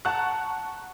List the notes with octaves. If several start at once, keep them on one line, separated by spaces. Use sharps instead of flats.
F#5 A5 A#5 C#6 F#6